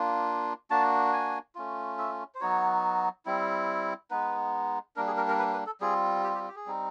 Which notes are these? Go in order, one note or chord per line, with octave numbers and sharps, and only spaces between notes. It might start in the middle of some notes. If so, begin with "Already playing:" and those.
Already playing: A#3 D4 F4
A#3 D4 F#4 A5
G#5
A3 C#4 F4
E5
C5
F#3 B3 D#4 F#4 C#5
G3 C4 E4
G#3 B3 D#4 B4
G3 A#3 D4 A#4
G#4
A#4
A#4
B4
B4
A4
G3 C4 F4 G#4
G4
G4
G4
G#4
G3 C4 D#4